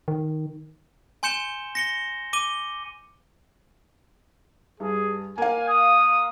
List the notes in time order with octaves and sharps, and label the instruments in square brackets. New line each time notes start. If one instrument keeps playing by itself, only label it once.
[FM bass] D#3
[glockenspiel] G#5 C6 G6 C#7 E7 G7
A#6 C#7 G7
D6 D#7 G7
[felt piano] G2 [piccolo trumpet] G#4
[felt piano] A#3 F5 [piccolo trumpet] G#5
[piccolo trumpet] D#6